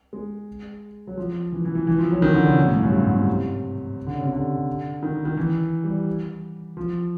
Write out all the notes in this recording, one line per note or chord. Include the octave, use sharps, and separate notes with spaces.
G#3
F#3
F3
E3
E3
E3
E3
F3
F#3
D#3
D3
C#3
B2
A2
G2
F#2
G2
G#2
C3
D3
C#3
C3
D3
D#3
D#3
E3
G3
F3